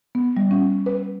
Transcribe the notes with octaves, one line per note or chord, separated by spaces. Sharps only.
B3
G3
C#4
B4